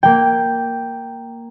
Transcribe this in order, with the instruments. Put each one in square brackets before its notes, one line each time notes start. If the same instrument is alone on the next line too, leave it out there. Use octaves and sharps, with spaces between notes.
[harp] A#3 G5